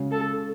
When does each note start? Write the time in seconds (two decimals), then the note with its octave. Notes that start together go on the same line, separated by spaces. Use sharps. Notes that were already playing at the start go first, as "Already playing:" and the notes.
Already playing: C#3 G#3 C#4 F#4
0.11 A4